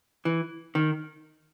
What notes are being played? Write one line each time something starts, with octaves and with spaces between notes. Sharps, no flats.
E3
D#3